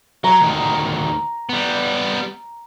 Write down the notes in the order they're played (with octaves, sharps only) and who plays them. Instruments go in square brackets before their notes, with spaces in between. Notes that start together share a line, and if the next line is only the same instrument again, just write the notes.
[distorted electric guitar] F#3 [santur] A#5
[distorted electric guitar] D2 D#3
G3 B3